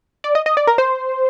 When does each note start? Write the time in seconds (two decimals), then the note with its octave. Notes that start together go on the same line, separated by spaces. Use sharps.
0.24 D5
0.35 D#5
0.46 D#5
0.57 D5
0.67 A#4
0.78 C5